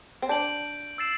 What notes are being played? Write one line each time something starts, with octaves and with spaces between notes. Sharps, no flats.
C4
D4 G6 D7 F#7
E6 A6 C7 E7